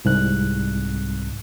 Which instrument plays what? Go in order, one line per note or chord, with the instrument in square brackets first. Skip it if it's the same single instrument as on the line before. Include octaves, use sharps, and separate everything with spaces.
[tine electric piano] C2 G#2 F#6